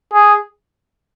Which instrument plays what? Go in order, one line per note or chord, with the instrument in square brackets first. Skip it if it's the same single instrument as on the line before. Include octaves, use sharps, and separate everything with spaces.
[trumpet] G#4